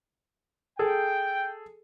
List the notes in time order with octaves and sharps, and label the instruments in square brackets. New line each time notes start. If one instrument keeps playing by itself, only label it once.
[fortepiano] G#4 A4 [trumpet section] G5